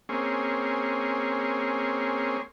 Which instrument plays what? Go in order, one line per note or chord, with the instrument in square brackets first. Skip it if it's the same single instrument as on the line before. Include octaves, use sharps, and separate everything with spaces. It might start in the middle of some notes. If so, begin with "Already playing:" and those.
[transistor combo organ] A#3 C4 C#4 G#4